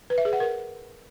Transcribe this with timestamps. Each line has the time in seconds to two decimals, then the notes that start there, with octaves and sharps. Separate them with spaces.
0.10 B4
0.18 E5
0.25 G#4
0.33 F#5
0.40 A#4